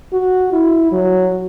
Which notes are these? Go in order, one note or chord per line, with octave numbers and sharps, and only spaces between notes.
F#4
E4
F#3